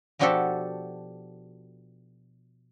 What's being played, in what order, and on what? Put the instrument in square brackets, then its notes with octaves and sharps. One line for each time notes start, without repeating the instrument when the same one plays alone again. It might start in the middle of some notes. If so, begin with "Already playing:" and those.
[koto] B2 F3 D4 F#4 G4 A4